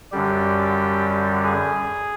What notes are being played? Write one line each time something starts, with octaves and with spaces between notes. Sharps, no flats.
F#2 D3 G3 G4
G#4